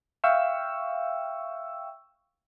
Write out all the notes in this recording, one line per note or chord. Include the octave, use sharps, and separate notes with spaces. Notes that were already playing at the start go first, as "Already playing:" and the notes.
E5 F5 G5 C#6 E6